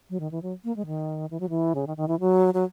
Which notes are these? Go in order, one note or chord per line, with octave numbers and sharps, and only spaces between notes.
F#3
D#3
E3
F#3
A#3
G#3
D#3
E3
F#3
E3
C#3
D#3
D#3
E3
F#3
F#3